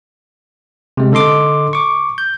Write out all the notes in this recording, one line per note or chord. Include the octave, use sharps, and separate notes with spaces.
C3 G#3
D3 A4 D#5 C6 D6
C#6 D6
G6